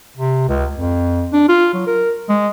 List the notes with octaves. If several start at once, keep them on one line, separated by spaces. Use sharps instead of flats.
C3
C#2
F2
D4
F4
F#3
A#4
G#3